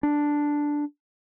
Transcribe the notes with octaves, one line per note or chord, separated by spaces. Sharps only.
D4